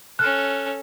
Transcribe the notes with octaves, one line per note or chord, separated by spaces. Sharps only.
C#4 A4 F6 F#6